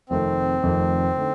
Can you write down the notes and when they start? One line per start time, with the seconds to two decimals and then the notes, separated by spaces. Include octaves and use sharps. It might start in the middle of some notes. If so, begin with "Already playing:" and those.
0.09 F1 F2 D#3 A3 C4
0.63 F1 F2 D#3 A3
1.17 D3 A3 D#4